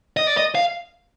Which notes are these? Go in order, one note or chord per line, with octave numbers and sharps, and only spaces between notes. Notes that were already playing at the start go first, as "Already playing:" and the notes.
D#5
D5
D#5
F5